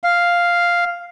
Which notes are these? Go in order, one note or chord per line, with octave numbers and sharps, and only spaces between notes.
F5